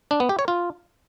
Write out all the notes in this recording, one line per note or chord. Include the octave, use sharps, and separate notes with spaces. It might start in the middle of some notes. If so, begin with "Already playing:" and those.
D4
B3
G4
C#5
F4